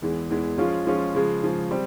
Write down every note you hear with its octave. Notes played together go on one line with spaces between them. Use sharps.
E2 E3 G#3
E2 E3 G#3
F3 G#3 C#4 F4
F3 G#3 C#4 F4
C#3 F3 G#3
C#3 F3 G#3
G3 C4